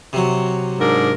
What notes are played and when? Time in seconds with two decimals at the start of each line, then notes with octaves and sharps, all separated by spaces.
0.13 C3 F#3
0.78 G#2 D4 A#4